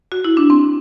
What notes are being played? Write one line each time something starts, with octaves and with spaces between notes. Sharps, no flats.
F#4
E4
D4
C4